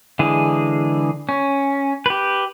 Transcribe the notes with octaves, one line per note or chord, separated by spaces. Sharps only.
D3 E3 G#3 G#4
C#4
G4 B4